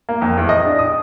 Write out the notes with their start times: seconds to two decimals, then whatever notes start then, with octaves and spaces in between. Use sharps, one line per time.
0.09 A#3
0.22 F2
0.37 E2
0.49 D#5
0.65 D4
0.79 D#6